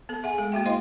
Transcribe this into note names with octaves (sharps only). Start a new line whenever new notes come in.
B3 A4
G#4 E5 F#5 G#5
G#3 A4
A#3 F#4 E5 G5
E4 C5 D#5 F5 C6